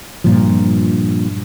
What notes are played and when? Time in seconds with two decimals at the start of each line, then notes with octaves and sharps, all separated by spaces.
0.24 G2 A#2 F3